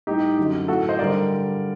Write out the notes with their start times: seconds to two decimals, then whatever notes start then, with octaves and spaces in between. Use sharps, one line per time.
0.07 A2 G3 D#4 G4
0.37 F#2 D3 F#3
0.68 A2 F#4 A4
0.72 F#3
0.89 C5 D#5
0.99 G2 D3 G3 A#4 D5